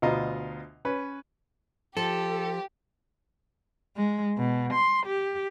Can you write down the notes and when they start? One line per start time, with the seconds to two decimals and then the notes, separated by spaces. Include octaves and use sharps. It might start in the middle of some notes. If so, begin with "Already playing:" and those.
0.02 D2 B2 F4 D#5 A#5
0.85 C#4 B4
1.97 F3 G4 A4
3.96 G#3
4.37 B2
4.73 C6
5.05 G4